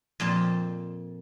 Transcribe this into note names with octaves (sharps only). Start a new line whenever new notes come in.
F2 A#2 C5 A5